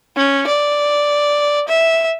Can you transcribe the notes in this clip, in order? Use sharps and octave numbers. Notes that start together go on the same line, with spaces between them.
C#4
D5
E5